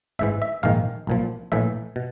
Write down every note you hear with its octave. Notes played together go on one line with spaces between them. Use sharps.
A1 G#2 E3 E5
E5
A#1 G#2 D#3 F5
B1 A#2 F3
A#1 A2 E3 E5
B2